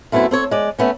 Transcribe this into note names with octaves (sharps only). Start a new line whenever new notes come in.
F#2 A3 B3 C4 E4
C4 A4 C#5
G#3 D5
A3 B3 C#4